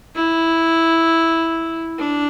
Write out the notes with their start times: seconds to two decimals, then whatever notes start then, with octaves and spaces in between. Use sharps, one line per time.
0.15 E4
1.98 D4